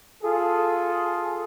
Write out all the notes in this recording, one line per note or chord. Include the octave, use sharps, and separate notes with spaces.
F4 G#4 A4